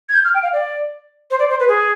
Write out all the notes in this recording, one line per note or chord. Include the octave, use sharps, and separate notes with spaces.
G#6
G6
F6
G5
F5
D5
C5
D5
C5
B4
G#4